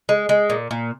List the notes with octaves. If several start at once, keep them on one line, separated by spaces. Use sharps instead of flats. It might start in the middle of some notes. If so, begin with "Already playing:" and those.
G#3
G#3
A#2
A#2